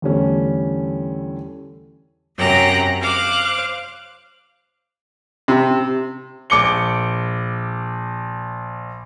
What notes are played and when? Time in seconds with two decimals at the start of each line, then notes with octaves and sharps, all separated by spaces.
0.02 E2 D3 G3 A3 C#4
2.36 F#2 C3 G5 A#5 F#6 A#6
3.00 C5 F5 D6 F#6
5.48 C3
6.50 A#1 D6 C#7 G7